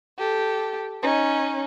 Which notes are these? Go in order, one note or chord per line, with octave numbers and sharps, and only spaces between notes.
G4 A4
C#4 D#4